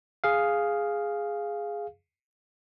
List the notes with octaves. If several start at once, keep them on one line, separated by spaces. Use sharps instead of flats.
G#4 F5